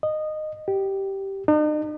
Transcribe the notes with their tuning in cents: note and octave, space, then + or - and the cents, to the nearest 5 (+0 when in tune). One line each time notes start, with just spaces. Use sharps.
D#5 -15
G4 -10
D#4 -45